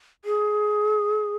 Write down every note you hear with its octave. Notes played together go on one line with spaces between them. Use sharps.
G#4